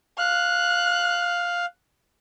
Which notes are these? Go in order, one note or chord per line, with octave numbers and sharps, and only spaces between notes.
F5 F#6